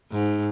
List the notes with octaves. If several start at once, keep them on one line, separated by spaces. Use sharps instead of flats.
G#2